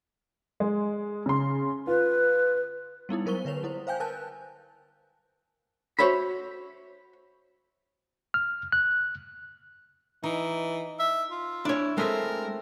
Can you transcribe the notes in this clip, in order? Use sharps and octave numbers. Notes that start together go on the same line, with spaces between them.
G#3
C#3 C6
F4 B4
G3 B3 D#4 E4
F#3 A#4 C5 C#6 G7
D3 B4 C#5 F7
G3 E4 C5
C5 F5 G5 G#5 G6
A#4 B4 G#5 A5 F#6
F#4 C5 C#5 E5 B5
F6
F#6
E3 D#4
E5
F4
D4 E4 C#5
G#3 A3 C4 A#4 E5